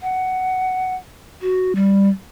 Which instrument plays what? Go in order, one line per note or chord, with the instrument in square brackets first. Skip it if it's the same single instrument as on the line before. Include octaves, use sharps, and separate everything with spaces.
[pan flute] F#5
F#4
G3